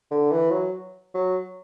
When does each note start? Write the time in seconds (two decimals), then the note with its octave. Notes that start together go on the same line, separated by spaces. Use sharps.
0.11 D3
0.32 E3
0.51 F#3
1.14 F#3